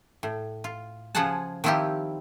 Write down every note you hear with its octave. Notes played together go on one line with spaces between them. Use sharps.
A2
F4
C#3 F3 F4 G#4 F#5 A5
D#3 F3 C4 E4 F4 G4